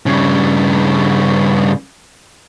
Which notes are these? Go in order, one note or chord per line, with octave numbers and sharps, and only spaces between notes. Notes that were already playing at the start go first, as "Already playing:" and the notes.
G2 C#3